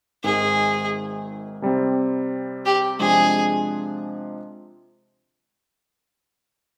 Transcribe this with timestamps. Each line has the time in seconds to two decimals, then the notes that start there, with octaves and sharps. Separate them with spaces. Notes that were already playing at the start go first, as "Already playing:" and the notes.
0.24 G#1 G#2 D#3 G#4
1.62 C3 G3 C4
2.66 G4
2.99 C3 F3 G#3 D4 G#4